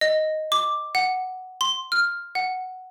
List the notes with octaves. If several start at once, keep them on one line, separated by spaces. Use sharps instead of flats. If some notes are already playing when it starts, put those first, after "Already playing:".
D#5
D6
F#5
C6
F6
F#5